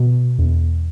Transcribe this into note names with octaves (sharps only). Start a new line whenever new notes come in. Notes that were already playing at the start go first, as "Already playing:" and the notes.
Already playing: B2
E2